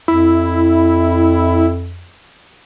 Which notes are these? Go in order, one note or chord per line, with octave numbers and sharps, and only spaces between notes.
F2 E4